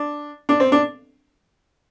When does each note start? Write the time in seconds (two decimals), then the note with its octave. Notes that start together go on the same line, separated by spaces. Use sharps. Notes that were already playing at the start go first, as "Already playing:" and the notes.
Already playing: D4
0.49 D4
0.60 C4
0.72 D4